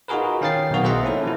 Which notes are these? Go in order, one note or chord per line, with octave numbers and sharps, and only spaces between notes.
D#4 F4 F#4 G#4 A#4 B4
D#3 C#4 F5 G5 A6 C7
B1 B2 D#3 F#4
G#4 A#4 C5 D#5 E5 F#5
A#3 C#4 E4 A4
F3 E4